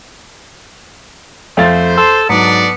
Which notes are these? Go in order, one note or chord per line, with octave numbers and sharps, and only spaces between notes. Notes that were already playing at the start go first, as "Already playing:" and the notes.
F2 A3 C5 F5 A6
A4 C6
G#2 F#3 B3 D4 A4 D5